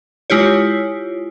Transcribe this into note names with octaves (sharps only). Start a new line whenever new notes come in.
G#3 E4 F4 G4 C#5